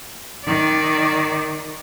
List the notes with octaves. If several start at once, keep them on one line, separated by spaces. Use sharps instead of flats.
D#3 D5